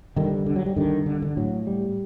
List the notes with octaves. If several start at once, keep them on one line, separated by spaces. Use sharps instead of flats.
G2 D3 D#3
D3
F#3
G3
G2 D3 D#3
D3
D3
A2 F#3
G3